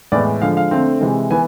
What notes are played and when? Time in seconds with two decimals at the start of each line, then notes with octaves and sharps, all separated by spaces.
0.12 A2 E3 G#3 B3 D5
0.42 D3 F3 G#3 F5
0.57 F5
0.71 D3 A3 C4
1.01 C3 E3 G#3
1.31 E3 B3 G#5